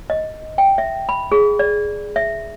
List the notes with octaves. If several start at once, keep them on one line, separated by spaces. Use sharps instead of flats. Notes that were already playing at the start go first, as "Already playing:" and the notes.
D#5
G5
E5
B5
G#4
D5
E5